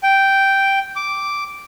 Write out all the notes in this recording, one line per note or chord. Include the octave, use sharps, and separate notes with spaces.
G5
D6